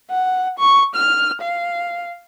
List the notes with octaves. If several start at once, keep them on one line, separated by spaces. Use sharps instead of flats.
F#5
C#6
F6
F5